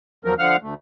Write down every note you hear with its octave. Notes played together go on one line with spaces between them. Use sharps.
E2 F3 F#3 A#4
D3 F3 F5 F#5 F6
D2 A3